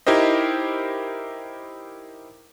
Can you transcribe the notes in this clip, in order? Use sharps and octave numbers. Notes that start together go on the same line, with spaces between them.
D#4 E4 G4 A#4 C5 D#5